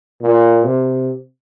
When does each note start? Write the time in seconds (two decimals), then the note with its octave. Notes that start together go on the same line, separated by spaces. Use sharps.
0.22 A#2
0.64 C3